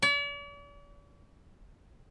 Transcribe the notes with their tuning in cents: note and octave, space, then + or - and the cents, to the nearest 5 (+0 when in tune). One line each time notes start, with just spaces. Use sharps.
D5 -45